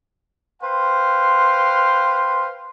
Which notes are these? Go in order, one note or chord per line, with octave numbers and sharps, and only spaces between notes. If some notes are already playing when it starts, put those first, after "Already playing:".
B4 C5 F5 G5 C6